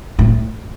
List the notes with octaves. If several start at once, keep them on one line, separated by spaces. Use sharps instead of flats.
A2